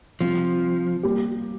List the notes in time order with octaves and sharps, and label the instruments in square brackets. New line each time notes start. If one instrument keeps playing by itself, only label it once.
[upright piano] C3 G3 C4 [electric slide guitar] F3
[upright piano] G3 A#3 G4